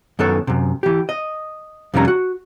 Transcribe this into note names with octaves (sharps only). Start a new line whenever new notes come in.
F#2 D#3 B3 A4 C#5
F#2 C3
E3 G4
D#5
F2 C3 D#3 G3 C#4 A#5
F#4